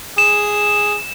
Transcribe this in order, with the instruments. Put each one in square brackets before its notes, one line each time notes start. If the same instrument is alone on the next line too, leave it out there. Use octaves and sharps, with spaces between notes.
[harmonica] G#4 [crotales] E7